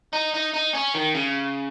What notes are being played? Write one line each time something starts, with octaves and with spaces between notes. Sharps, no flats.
D#4
D#4
D#4
C#4
D#3
C#3